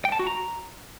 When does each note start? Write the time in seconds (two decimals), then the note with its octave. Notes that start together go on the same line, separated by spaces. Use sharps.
0.05 G5
0.12 A5
0.19 F#4
0.27 A#5